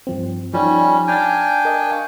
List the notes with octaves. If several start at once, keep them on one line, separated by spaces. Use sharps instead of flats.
G2 F3 C4
F3 G3 C#4 D#4 G4
D4 G5 G#5 A#5 F6 A6
A#4 D#5
F5 C#6